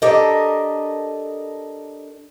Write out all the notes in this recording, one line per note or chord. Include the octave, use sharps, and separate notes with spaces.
D4 G4 A4 A#4 D#5